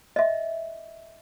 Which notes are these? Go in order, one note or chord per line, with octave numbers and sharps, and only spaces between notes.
D#5 E5